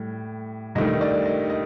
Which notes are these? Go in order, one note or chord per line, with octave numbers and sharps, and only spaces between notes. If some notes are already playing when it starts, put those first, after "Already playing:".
Already playing: A2 G3
G2 D#3 A3 D#5
D5
D#5
D#5